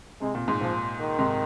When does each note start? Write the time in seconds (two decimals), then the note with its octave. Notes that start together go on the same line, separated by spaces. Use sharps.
0.21 C3 G#3
0.35 A#2
0.48 G#2
0.61 A#2 F3
1.00 D#3
1.19 G#2 C3